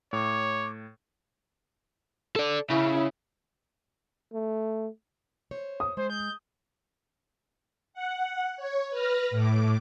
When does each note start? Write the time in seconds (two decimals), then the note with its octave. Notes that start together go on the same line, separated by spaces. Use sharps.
0.13 A2 C#5 D6
2.36 A4 D5
2.70 C#3 E4
4.33 A3
5.51 C5 C#5
5.80 D#6
5.97 G#3 C5
6.10 G6
7.94 F#5
8.56 C#5
8.90 B4 F6 A#6
9.31 A2 D6